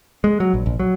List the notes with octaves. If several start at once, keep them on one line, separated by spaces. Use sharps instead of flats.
G#3
F#3
A#1
A#1
F#3